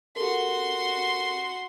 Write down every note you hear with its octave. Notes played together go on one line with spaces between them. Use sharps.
F#4 G4 A4 A#4 C6